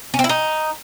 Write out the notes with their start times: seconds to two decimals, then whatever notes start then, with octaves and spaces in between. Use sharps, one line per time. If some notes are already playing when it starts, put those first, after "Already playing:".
0.14 C#4
0.19 C4
0.24 E4
0.29 D#4